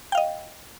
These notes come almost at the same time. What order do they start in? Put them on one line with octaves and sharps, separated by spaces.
G5 F5 D#5